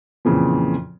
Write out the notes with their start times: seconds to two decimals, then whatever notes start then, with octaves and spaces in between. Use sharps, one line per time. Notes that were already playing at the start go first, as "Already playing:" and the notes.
0.25 F2 A#2 C#3 E3 F3